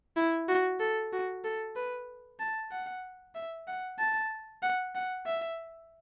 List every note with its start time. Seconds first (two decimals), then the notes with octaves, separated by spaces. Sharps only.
0.16 E4
0.49 F#4
0.80 A4
1.12 F#4
1.44 A4
1.76 B4
2.40 A5
2.71 F#5
3.35 E5
3.67 F#5
3.99 A5
4.62 F#5
4.95 F#5
5.26 E5